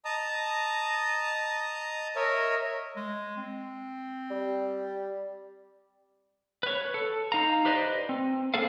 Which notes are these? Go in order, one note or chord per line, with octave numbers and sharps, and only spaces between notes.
D#5 A5 A#5 D#6
A#4 C#5 D#5 E5
G#3
C4
G3
B4 C#5
A4
D#4 F5 A#5
G4 B4 C5 D5 D#5
C4
A#3 G#4 A4 C5 F5